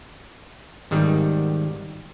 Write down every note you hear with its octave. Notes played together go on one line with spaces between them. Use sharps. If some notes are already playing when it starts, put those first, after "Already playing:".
G#1 D#3 G3